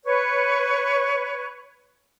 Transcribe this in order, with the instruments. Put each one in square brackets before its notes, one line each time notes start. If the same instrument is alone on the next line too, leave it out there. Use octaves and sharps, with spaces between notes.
[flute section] B4 C#5